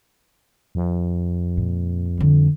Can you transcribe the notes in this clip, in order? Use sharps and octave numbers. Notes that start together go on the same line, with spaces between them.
F2
A#2
D3 G3